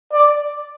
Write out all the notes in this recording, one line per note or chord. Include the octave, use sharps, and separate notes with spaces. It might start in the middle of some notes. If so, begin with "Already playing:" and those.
D5